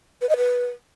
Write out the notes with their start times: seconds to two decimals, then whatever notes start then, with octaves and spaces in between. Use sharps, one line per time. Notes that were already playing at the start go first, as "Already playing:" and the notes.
0.21 B4
0.29 D#5
0.37 B4